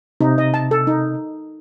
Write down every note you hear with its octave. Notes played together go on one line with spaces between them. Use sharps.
C3 D#4
D#5
A5
A4
D#4